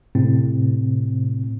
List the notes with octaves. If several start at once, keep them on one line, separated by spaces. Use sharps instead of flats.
A2 C3 C4